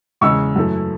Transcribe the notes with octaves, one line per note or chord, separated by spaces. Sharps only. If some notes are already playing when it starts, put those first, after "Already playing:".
E2 C#3 G#3 C#6 E6
F#2 E3 A3